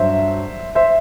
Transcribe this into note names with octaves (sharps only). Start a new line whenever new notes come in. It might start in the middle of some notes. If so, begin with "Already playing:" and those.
Already playing: G2 F#3 C5 E5
C5 E5